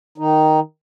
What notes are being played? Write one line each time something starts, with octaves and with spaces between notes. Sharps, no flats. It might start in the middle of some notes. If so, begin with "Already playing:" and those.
D#3 D#4